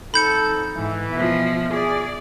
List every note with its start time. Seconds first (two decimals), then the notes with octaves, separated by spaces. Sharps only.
0.14 F2 D#4 A4 B5 G6 C#7
0.75 G#2 E3
1.12 B2 F3 E5
1.72 G#4 D5